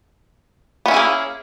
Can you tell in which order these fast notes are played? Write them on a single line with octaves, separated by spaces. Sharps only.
B3 C#4 E4 G#4 A#3